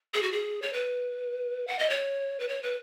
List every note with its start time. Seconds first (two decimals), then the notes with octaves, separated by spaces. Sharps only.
0.14 G#4
0.23 F#4
0.32 G#4
0.62 C#5
0.73 B4
1.67 F#5
1.79 D#5
1.90 C#5
2.40 B4
2.49 C#5
2.63 B4